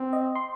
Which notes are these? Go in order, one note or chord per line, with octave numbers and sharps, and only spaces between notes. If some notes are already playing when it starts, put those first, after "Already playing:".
Already playing: C4
D#5
C6